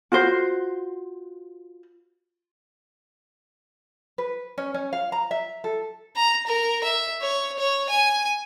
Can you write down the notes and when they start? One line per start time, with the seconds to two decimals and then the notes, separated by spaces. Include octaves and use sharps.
0.12 F4 F#4 C5
4.18 B4
4.58 C#4
4.74 C#4
4.93 F5
5.12 A#5
5.31 E5
5.64 A4
6.16 A#5
6.46 A#4
6.84 E5
7.22 C#5
7.59 C#5
7.90 G#5